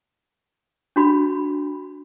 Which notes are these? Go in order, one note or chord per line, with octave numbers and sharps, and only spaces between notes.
D4 F#4 B5